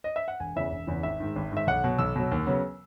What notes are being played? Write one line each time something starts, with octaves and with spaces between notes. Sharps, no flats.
D#5
E5
F#5
E1 G#5
E2 C#3 E3 E5
E1
E2 C#3 E3
G#1 E5
G#2 D#3
G#1
G#2 D#3 E5
B1 F#5
B2 F#3
B1 E6
B2 F#3
D#2
C#3 F#3 B3